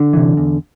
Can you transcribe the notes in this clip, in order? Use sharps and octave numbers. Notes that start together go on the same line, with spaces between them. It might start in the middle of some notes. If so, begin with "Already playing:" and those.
Already playing: D3 D4
C3 E3
E2